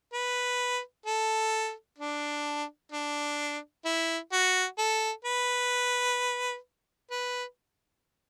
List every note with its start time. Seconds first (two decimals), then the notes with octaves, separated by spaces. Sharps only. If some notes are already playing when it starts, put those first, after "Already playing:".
0.13 B4
1.06 A4
1.99 D4
2.92 D4
3.85 E4
4.32 F#4
4.78 A4
5.25 B4
7.11 B4